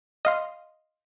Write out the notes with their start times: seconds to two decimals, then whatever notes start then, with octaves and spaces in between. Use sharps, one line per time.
0.25 D#5 F5 C6